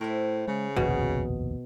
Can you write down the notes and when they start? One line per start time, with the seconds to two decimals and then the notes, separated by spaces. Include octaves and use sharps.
0.01 A2 A#4 C5 E5
0.48 C#3 G#3
0.76 F1 A#1 D#2 B2